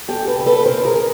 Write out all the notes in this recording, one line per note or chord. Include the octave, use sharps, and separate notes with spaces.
E2 G4 A4
A4 B4
C#3
A4 B4
E2 A#4 C5
G#4 A#4